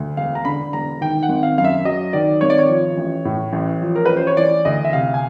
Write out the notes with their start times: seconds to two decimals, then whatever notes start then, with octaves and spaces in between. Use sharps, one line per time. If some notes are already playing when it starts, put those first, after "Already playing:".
Already playing: D2
0.17 E1 F5
0.35 A#5
0.45 D3 B5
0.73 E1 A#5
1.01 D#3 G5
1.23 F#5
1.29 G#1
1.43 F5
1.58 F#2 F5
1.64 E5
1.85 F#3 D#5
2.13 D#3 D5
2.41 G#1 C#5
2.50 D5
2.59 C#5
2.69 F3
2.97 A1
3.25 A2
3.53 A1
3.82 F3
3.96 A#4
4.05 A1 B4
4.17 C5
4.27 C#5
4.37 E3 D5
4.65 D2 D#5
4.85 E5
4.93 C3 F5
5.14 G#5